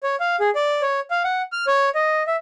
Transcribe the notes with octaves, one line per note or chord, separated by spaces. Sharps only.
C#5
F5
G#4
D5
C#5
F5
F#5
F6
C#5
D#5
E5